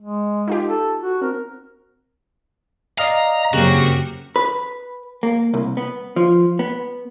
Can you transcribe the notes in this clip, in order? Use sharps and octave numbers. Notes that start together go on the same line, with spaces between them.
G#3
D#4 F4 G4
A4
F#4
C4 A#4
D5 D#5 F5 A#5
F#2 C#3 A#3 C4 F#4 G4
B4
A#3
C2
B3
F3
B3